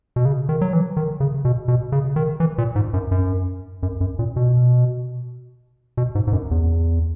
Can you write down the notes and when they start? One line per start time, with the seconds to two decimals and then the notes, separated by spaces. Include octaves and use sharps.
0.16 B2
0.25 C#3
0.49 D#3
0.61 F#3
0.73 E3
0.97 D#3
1.20 C#3
1.45 B2
1.68 B2
1.92 C#3
2.16 D#3
2.40 E3
2.58 A#2
2.76 G#2
2.94 F#2
3.11 F#2
3.83 F#2
4.01 F#2
4.19 A#2
4.36 B2
5.97 B2
6.15 G#2
6.27 G#2
6.33 F#2
6.51 E2